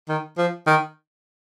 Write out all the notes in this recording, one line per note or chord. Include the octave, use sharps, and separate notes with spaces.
D#3
F3
D#3